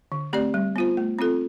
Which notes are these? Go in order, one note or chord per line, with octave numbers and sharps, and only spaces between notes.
D3
A3 C4 G4 D5
G3
B3 F4 C5
A3
C4 F4 A4